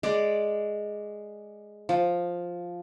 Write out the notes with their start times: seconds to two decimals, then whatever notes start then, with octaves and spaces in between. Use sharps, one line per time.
0.03 G#3 D5
1.89 F3